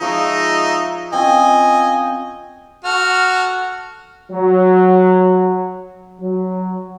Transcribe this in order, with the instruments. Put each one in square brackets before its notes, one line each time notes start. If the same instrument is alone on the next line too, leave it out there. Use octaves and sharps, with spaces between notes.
[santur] F3 C#5 D6 [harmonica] G#3 D#4 E5
[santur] C4 C#4 F4 [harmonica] D#5 G#5
[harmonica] F#4 A4 [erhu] F6
[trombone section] F#3
F#3